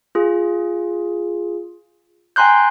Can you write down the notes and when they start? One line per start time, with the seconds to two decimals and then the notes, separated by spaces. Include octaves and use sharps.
0.15 F4 G#4
2.36 G5 G#5 A#5 C6 F#6 G6